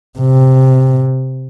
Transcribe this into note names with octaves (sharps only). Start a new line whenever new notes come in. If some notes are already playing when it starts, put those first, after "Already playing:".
C3